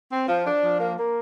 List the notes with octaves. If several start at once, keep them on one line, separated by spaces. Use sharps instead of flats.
C4
F3
D4
F3
A#3
A#3